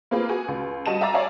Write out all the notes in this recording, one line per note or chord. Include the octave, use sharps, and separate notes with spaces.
A#3 C4 F4 G#4 B4
F#4 G#4 G#5
C#2
G3 F#4 D#5 A5 D#7 E7
E5 F5 A#5 D6 A6
C#5 D5 E5 F5 G#5 A5